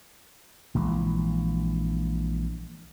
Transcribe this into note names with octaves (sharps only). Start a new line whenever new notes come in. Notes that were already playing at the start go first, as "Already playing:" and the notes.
A#1 E3 G#3